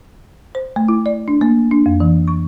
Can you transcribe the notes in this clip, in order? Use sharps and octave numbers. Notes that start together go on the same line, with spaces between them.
C5
A3
E4
D5
D4
A#3
D4
F2
E3
C#6